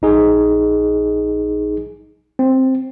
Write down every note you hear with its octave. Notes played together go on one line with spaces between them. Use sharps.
A#1 D#4 G#4
C4